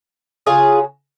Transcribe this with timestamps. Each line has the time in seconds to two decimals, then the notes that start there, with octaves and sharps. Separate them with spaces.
0.46 C#3 F#3 F4 G#4